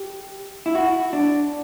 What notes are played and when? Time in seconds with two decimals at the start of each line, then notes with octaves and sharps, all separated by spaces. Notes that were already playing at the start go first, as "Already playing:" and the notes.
Already playing: G4
0.66 E4
0.75 F#4
1.13 D4